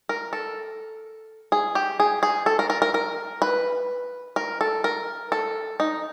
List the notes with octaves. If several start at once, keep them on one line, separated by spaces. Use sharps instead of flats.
A#4
A4
G#4
G4
G#4
G#4
A4
A#4
A#4
A#4
A#4
B4
A#4
A4
A#4
A4
D#4